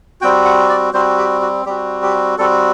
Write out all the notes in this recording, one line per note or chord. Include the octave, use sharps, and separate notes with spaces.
G3 C4 F#4 G5
F#5
D5
G3 C4 F#4 C5
G4
F#4
G3 C4 F#4 G4
G4
G3 C4 F#4 A4